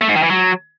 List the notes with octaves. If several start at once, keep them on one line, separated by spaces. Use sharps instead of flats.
A3
G#2
D#3
E3
F#3